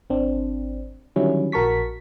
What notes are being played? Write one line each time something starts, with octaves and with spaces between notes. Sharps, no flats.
G#1 C4 D4
D3 D#3 F#3 G3 C#4 E4
A#1 F#4 A#4 A5 C#6 B6